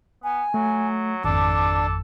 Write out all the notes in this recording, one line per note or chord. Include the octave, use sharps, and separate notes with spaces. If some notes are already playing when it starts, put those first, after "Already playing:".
B3 G#5
F#3 A3
G#1 F2 D4 A4 D6